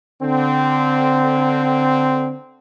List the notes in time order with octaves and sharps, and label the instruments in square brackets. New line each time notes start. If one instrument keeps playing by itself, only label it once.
[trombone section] D3 C4